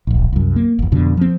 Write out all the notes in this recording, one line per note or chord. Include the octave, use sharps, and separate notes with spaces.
D1 A#1
C2 F#2
A#3
G1 E2
F2 B2 D3
F3 C4